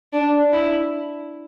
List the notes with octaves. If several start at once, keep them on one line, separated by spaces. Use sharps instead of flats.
D4
E4